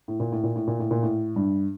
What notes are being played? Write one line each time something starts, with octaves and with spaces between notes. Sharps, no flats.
A2
A#2
A2
A#2
A2
A#2
A2
A#2
A2
G2